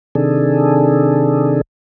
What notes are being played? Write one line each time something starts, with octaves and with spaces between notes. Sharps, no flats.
C3 D#3 D4 G#4 A4